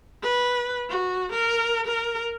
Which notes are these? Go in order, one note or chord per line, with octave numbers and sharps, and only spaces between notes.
B4
F#4
A#4
A#4